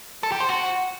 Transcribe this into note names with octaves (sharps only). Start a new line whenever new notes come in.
A4
G4
C5
F#4